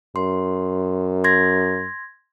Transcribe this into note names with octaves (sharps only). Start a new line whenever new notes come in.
F#2 C6
C6 G#6 A#6